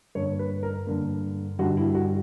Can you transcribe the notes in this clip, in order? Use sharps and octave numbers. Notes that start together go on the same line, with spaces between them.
G2 D3 A#3 C#5
B4
A#4
G2 D3 A#3
G2 D3 G3 F#4
E4
F#4